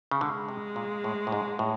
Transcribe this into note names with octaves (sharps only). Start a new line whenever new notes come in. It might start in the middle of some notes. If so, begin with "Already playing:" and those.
C#3
D3 G#3
C3
A#2
A2
A2
G#2
A2